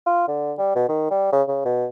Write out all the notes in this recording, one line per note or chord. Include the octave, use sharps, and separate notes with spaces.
F4
D3
G3
B2
D#3
G3
C#3
C#3
B2